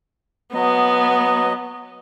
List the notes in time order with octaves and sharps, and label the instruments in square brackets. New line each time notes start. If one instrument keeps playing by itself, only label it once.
[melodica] F#3 D#5 [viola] B3